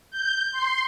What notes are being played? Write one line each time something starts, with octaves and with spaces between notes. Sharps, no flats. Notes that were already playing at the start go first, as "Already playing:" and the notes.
G6
C6